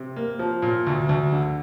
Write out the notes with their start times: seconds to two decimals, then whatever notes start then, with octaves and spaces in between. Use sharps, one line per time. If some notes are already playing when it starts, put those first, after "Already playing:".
Already playing: C3
0.16 A#3
0.39 F3
0.62 A#2
0.87 D2
1.09 D2
1.33 D3